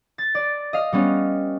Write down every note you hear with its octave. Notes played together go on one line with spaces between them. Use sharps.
A6
D5
D#5 F5
G3 B3 C#4